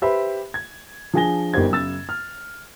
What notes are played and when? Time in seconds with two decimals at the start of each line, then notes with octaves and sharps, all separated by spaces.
0.02 G4 B4 C5 E5 B5
0.54 G#6
1.13 F3 D4 G#4 G#5 A#6 G7
1.54 G1 D#4 G4 A#4 C5 G#6
1.71 F#2 C#3 E6 A6
2.09 F6